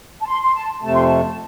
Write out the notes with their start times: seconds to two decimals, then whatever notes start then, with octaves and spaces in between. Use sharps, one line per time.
0.22 A5
0.27 C6
0.42 C6
0.55 A5
0.83 F2 C3 A3 A5
0.94 C6
1.06 A5